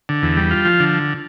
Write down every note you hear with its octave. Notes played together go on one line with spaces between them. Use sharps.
D3
E2
G3
F4
F3
D3